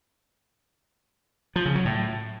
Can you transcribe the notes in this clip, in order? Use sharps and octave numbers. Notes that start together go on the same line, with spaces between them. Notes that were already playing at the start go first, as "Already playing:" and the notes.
F3
C#3
F#3
A2